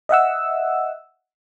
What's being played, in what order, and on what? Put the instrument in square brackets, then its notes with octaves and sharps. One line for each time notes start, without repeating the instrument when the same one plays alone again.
[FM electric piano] D#5 E5 F#5 E6